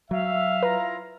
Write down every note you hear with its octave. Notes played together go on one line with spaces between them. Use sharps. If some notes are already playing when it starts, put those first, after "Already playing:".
F#3 E5 F5
E4 F4 B4 A#5